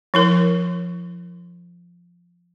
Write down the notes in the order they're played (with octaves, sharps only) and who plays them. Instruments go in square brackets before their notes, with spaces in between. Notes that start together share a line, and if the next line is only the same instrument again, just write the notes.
[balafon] F3 E4 A#4